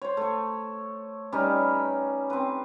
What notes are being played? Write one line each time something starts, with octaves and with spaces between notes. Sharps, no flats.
C5 C#5
A3 C#6
G3 C#4 D#4 B4
C4 B4